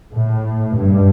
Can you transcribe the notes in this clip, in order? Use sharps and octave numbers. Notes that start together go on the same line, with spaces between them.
A2
G2